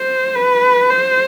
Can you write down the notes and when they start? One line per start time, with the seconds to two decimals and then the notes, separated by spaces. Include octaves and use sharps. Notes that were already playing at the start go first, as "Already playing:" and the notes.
Already playing: C5
0.35 B4
0.90 C5